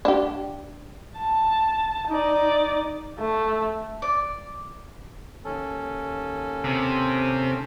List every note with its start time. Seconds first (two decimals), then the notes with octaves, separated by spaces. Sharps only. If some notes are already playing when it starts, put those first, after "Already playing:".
0.05 D4 G4
1.17 A5
2.08 D#4 D5
3.19 A3
4.02 D5
5.45 D#2 C#4 A4
6.64 C3